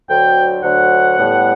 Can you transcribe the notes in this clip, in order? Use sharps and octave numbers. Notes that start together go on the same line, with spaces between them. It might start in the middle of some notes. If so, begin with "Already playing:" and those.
D2 D3 F#3 G5
D2 D3 F#3 F#5
A2 G3 B3